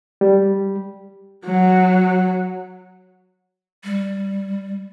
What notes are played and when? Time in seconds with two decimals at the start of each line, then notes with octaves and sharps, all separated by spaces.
0.21 G3
1.45 F#3
3.84 G3